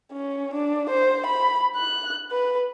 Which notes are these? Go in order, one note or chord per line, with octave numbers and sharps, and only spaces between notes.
C#4
D4
C5
B5
F#6
B4